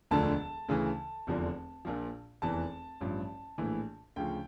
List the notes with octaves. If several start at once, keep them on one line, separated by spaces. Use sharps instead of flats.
E1 D2 D3 F3 A5
D2 C#3 E3
F1 E2 D3 F3
A#1 A#2 F3
F1 E2 E3 A5
A1 G2 F3
A#1 A2 E3
D2 C#3 F3 G5